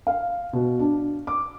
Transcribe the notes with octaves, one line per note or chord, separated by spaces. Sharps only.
F5
B2
D4
D6